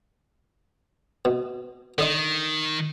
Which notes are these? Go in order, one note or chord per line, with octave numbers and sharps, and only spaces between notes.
B2
D3 D#3 D#5 C6